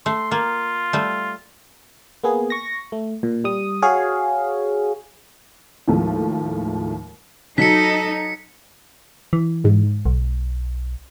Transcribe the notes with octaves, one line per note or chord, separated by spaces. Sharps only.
A3 C6
A#3 F4
G3 A3
A#3 B3 G#4
C#6 A#6
A3
A#2
G3 D#6
F#4 G#4 C#5 F5
D#2 A2 F3 G#3 A3
F#3 D#4 A4 B6 C#7
E3
G#2
B1